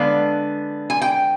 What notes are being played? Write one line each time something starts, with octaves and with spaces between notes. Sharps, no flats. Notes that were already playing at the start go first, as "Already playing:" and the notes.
Already playing: D3 G#3 B3 D4 F5
G#5
G5